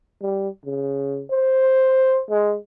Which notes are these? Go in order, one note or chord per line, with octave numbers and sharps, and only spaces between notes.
G3
C#3
C5
G#3